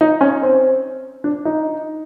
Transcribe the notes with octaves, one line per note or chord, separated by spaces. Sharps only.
D#4
C#4
C4
D4
D#4